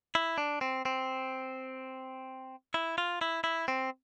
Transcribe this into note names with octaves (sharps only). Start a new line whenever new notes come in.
E4
D4
C4
C4
E4
F4
E4
E4
C4